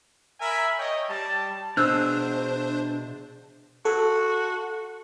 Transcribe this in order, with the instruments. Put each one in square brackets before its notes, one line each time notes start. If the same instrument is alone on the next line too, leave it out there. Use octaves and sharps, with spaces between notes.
[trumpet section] A#4 E5 G#5 B5
C#5 D#5 G5
G3 A5
[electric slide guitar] B2 G#4 [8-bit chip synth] D4 C5 [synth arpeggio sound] E6 [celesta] F#6 G6
[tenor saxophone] F#4 [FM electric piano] A4